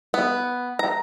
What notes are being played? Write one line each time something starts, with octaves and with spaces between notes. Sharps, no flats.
B3
A#5